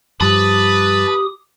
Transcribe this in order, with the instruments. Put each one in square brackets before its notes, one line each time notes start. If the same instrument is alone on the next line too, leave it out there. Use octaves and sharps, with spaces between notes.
[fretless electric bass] G2 F3 [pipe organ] G4 D#6 [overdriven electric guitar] B4 [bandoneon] A5